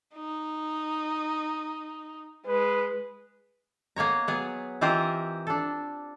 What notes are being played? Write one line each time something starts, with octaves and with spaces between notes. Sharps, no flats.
D#4
G#3 B4
A#3 B3 C#5 A#5
F#3 B3 G#4
E3 C4 F4 G4 A#4 D#5
D4 A4